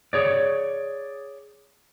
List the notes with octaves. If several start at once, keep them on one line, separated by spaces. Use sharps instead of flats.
G#4 C#5 D5